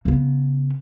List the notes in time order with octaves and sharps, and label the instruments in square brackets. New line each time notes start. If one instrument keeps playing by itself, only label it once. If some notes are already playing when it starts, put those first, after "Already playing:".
[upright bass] C#3 B3